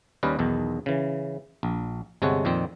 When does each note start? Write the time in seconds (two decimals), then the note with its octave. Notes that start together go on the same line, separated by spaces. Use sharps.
0.23 D#2 G3 C#4 B4 D#5 F5
0.39 B1 E2 D#3
0.86 C#3 E3
1.63 A#1
2.22 G1 C3 G#3 A4 C#5 F#5
2.45 F2 A#2 D#3 C4